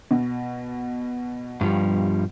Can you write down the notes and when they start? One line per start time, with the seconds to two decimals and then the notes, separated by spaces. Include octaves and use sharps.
0.11 B2
1.61 G2 F3 G3